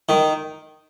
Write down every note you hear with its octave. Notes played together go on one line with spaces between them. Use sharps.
D#3